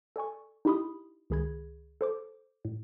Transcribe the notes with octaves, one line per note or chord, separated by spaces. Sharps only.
A4 D5 G#5 C#6
D#4 E4 G4 B5 C6 D#6
C#2 D#3 G#4 B5 G#6
A4 C5 D6
A2